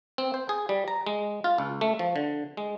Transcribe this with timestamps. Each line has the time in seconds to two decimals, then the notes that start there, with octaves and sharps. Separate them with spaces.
0.18 C4
0.34 C5
0.49 G#4
0.69 G3
0.88 A#5
1.07 G#3
1.44 F4
1.58 C#2
1.81 A3
1.99 F3
2.16 D3
2.57 G#3